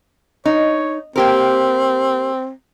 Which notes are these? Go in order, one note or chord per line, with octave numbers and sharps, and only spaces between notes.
D#4 C#5
A#3 C4 G4 A#4